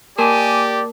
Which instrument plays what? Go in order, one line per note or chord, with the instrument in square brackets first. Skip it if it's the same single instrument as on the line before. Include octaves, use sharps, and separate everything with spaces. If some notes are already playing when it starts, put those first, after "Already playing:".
[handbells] A#3 A#4 A5 [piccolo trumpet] G4 [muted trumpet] D5 [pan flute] G#5